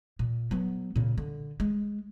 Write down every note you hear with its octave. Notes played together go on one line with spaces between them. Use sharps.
A#2
F#3 B3
A#2 C#3
D3
G#3